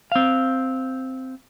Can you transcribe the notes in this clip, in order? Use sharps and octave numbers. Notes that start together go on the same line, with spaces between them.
C4 F5